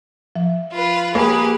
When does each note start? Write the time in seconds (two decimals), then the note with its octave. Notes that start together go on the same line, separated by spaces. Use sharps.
0.36 F3 E5
0.72 F4 B4
1.15 A#3 G4 G#4 B4